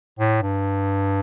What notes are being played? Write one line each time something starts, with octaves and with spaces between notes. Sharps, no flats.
A2
G2